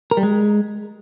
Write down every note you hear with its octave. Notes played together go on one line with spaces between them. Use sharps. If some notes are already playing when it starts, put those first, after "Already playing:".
A#4
G3
G#3